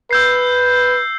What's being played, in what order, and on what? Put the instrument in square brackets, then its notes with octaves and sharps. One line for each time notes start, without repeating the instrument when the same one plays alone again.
[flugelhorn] B4 [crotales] E6 G6 C7